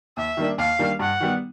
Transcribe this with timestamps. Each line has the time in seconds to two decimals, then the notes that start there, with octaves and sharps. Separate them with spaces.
0.17 D#2 E5
0.37 D#3 G3 A#3 D4
0.58 D#2 F5
0.79 D#3 G3 A#3 D4
0.99 G2 F#5
1.21 D#3 G3 B3